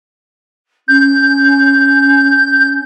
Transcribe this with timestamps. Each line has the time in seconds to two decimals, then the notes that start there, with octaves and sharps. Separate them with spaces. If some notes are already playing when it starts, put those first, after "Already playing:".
0.88 C#4 G6